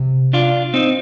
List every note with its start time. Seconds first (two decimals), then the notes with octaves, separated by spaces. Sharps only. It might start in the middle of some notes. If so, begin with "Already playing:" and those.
Already playing: C3
0.33 D4 F4
0.74 C4 D#4